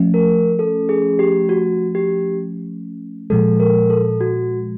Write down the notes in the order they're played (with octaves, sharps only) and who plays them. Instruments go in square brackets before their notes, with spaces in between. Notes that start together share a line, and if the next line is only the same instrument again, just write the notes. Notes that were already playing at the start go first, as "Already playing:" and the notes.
Already playing: [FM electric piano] F3 A3 C#4
[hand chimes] A#4
A4
G#4
G4
F#4
G4
[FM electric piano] A#2 F3 G#3 [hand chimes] A4
[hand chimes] A#4
A4
F#4